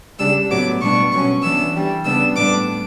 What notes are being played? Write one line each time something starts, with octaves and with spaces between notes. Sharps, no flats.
C#3 G3 D4 E6
A2 F#3 B3 D6
B2 G3 B3 D4 C#6
B2 F#3 C#4 C#6
E3 B3 D4 E6
E3 G3 D4
C#3 G3 B3 D4 E6
A2 G3 B3 D4 D6